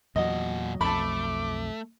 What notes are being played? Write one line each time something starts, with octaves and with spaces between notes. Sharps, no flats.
E2 A#2 F#3 D#5 F#5
B1 F2 A3 A5 B5 D6